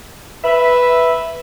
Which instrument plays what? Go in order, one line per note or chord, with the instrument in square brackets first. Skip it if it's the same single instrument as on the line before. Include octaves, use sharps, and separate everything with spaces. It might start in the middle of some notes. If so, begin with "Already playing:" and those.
[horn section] B4 E5